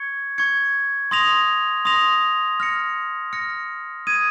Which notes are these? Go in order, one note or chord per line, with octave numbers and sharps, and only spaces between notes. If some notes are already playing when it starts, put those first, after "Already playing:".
Already playing: C#6 G#6 C#7
C#6 G#6 C#7
C6 D#6 A#6 F7
C6 D#6 A#6 F7
F6 A#6 C#7
F6 A#6 C#7
D#6 G#6 D#7